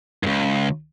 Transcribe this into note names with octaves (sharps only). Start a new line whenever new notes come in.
C#2 G2